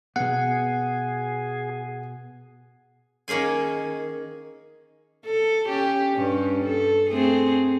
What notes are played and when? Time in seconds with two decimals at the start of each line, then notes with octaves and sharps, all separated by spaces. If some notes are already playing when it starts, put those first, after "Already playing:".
0.16 B2 B3 G#4 F#5
3.28 D#3 A#3 C#4 G#4 G#5
5.25 A4
5.68 C#4 G4
6.15 G2 C#4
6.64 A4
7.10 A3 C4 G#4